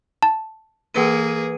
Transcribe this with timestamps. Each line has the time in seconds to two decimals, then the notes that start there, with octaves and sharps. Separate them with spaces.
0.23 A5
0.94 E3 A#3 G#4 B4 D#7